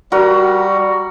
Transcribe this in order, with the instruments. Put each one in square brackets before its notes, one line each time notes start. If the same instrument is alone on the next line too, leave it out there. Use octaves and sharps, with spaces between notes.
[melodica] G3 [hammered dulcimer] F#4 A#4